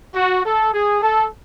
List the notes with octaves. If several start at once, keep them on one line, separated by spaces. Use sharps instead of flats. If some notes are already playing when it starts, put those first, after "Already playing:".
F#4
A4
G#4
A4